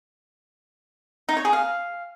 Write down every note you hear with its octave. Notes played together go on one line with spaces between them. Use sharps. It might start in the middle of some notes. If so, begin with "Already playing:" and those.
D#4
C#5
G#4
F5